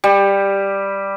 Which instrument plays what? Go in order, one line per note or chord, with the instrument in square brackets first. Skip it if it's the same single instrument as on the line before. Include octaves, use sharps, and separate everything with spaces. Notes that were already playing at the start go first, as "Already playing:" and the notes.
[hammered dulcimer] G3